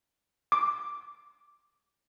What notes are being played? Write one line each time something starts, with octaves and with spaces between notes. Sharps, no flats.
D6